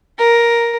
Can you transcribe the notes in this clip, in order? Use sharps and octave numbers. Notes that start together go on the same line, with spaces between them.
A#4